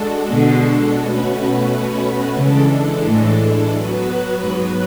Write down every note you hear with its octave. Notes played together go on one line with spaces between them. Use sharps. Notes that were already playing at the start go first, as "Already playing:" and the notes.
Already playing: G#3 D4 F#4 A4
B2 D3
B2 A3 C#4 F#4 B4
C#3 E3 G#3 D4 A4
A2
F#3 B3 F#4 B4
G#2